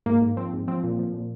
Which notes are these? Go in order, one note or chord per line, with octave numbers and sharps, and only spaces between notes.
G#2 A#3
G#2
F3 C4
G#2
F3 C4
A#2
F3
A#2